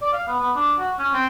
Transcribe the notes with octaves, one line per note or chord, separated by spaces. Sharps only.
D5
F5
B3
B3
D4
F#4
C#4
C4